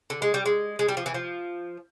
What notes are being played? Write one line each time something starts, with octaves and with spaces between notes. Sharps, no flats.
D3
G#3
G3
G#3
G#3
G3
F3
E3
F3